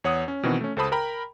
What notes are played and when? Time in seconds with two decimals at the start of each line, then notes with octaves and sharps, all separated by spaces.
0.04 E2 C#5 F#5 D#6
0.28 C#4
0.43 B2 D#3 E3 C4 F#4
0.61 A3 C#4
0.77 C#2 A4 C5 A5 B5 D#6
0.92 A#4 G5 A#5 B5